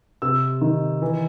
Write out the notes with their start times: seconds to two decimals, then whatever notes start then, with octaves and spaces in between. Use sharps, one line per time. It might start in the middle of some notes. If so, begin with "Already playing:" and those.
0.22 C3 E6
0.61 D#3
1.02 E3